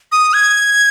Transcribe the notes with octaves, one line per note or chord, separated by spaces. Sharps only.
D#6
G#6